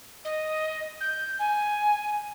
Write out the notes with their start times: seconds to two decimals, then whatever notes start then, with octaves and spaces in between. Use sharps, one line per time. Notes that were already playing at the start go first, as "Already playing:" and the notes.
0.25 D#5
1.00 G6
1.39 G#5